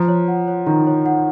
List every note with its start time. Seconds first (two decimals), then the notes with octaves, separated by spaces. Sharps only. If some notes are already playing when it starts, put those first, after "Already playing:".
Already playing: F3 A#5
0.08 C#5
0.28 F#5
0.48 C#5
0.66 D#3 A#5
0.87 C#5
1.06 F#5